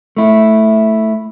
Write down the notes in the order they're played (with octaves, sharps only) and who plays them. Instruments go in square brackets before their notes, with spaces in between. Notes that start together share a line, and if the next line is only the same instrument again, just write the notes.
[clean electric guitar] A3 E4